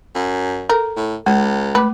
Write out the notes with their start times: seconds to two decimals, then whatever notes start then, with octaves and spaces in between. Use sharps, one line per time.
0.15 F#2
0.70 A4 A#4
0.96 A2
1.26 C#2 G#3
1.75 A3 B4 D6